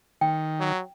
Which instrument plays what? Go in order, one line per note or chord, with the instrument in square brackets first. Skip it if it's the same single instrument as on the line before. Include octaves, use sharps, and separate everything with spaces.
[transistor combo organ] D#3 [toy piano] G5
[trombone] F#3